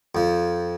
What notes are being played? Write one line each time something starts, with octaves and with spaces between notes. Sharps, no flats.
F2 F3